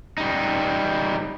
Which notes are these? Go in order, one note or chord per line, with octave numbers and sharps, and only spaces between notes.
G3 D#4